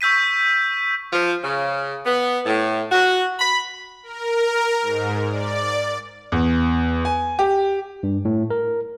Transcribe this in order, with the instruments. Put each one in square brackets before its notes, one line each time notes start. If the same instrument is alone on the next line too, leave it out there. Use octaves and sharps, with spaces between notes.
[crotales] C#6 E6 G6 B6 D#7
[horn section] F3
C#3
B3
A2
F#4
B5
[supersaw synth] A#4
G#2
D5
[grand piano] E2
G#5
G4
[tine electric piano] G2
A2
A#4